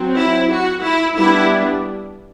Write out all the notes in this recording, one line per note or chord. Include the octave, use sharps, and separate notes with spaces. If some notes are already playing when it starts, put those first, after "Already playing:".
Already playing: F#3 C4
E4
F#4
E4
G3 B3 D4 E4